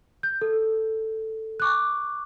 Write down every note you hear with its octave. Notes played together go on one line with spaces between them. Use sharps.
G6
A4
C#6 D6 F#6